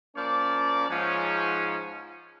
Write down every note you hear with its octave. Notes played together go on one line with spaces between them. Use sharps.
F3 A#3 C#4 D5
G#2 F3 C#4